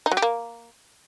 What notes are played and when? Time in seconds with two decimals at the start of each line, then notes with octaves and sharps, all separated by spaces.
0.06 D#4
0.11 F#3
0.17 G4
0.22 A#3